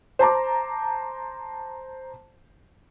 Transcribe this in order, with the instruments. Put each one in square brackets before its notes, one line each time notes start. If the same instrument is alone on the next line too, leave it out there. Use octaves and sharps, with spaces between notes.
[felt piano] C5 A5 A#5 D6